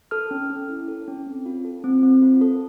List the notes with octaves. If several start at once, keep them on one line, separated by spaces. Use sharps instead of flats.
A4 F6
C#4
C#4
E4
A4
C#4
C4
F4
A4
C4
C4
F4
A4